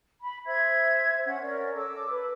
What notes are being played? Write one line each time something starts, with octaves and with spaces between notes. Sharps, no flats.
B5
C5 E5 G#6
C#4 F#5
C#4 A#4 C#5 D5
A4 D6 E6
B4